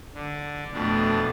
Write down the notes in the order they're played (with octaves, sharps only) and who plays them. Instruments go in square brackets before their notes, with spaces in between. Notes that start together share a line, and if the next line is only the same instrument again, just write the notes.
[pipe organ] D3
[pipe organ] F2 B2 D4 [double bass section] A3